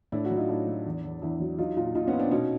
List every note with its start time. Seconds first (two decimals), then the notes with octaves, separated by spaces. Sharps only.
0.12 A2 D4 E4
0.24 E4 F#4
0.30 F#3
0.37 D#4 F4
0.49 A2 D4 E4
0.67 F#3
0.86 E2
1.04 E2
1.22 E2 D4 E4
1.40 F#3
1.58 F#3 D#4 F4
1.77 A#2 D#4 F4
1.95 A#2 D#4 F4
2.07 B3 C#4
2.13 A#2
2.20 C4 D4
2.31 B2 C#4 D#4